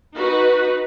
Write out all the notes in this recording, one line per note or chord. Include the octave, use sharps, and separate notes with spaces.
D#4 F#4 B4